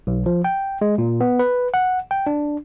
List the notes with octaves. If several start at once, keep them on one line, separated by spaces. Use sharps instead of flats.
B1
F3
G5
G#3
A#2
B3
B4
F#5
G5
D4